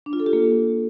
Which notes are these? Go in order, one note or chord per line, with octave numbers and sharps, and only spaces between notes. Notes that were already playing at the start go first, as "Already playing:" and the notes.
D4
F4
A4
G4
A#3